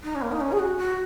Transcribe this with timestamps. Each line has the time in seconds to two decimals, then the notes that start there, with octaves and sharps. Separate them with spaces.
0.03 D#4
0.15 C#4
0.21 A#3
0.31 D#4
0.40 C#4
0.52 G#4
0.59 F#4
0.77 F#4